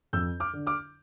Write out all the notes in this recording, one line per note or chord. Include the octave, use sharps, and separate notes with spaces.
F2 E6 G6
D6 F6
D3
D6 F6